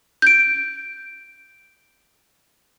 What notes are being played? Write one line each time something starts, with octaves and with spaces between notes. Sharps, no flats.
G6 D7